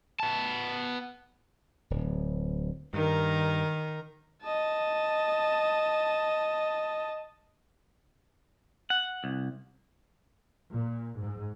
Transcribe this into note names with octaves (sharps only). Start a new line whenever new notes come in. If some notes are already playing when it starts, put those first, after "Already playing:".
B3 A5
D1
G2 D#3 A#4
D#5 A5
F#5
C2
A#2
G#2